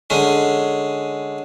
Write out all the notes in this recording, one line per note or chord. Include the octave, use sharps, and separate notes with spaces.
D3 G#3 C#4